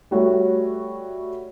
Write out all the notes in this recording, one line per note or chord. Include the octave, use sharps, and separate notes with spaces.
G3 A3 F#4 C#5